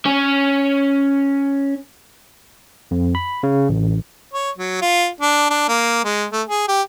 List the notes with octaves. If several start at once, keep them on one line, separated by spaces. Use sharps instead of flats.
C#4 C#5
F2
B5
C#3
A1
C#5
F#3
F4
D4
D4
A#3
G#3
A3
G#4
G4